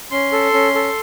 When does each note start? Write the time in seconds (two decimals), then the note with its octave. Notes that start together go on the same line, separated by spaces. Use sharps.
0.11 C#4 C6
0.32 A4
0.54 C#4
0.75 A4